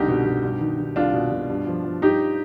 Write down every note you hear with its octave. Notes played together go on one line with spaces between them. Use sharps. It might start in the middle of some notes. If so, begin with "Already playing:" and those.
Already playing: C2 D3 D#4 G4
B2
B2
G2
D#3
D#3
C2 D4 F4
B2
B2
G2
F3
F3
G2 D#4 G4